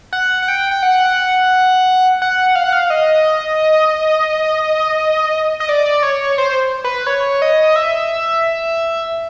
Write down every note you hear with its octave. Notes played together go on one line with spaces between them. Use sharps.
F#5
F#5
G5
G5
F#5
F#5
F5
F#5
F5
D#5
D#5
D5
C#5
C5
B4
C#5
D#5
E5